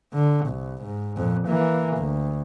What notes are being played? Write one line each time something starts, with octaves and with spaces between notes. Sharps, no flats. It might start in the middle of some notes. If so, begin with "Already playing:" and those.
D3
C2
G#2
F2 A#2
E3 A#3
D2